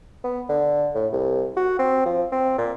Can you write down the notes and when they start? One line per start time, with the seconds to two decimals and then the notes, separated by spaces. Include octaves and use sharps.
0.24 B3
0.49 D3
0.95 A2
1.13 C2
1.57 F#4
1.79 C4
2.05 F3
2.32 C4
2.58 A#2